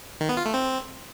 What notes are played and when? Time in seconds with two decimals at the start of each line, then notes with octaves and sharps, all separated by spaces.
0.21 D#3
0.29 B3
0.37 F4
0.46 A3
0.54 C4